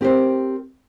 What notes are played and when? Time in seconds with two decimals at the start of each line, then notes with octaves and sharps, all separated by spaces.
0.01 C4 G4 A#4 C5